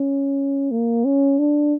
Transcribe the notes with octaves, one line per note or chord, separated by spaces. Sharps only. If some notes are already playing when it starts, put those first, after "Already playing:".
Already playing: C#4
A#3
C#4
D4